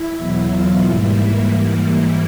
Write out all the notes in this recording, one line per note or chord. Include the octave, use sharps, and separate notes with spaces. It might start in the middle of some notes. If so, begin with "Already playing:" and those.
Already playing: E4
E2 B2 F#3
F4
G#2 E3 G3 A#3 E4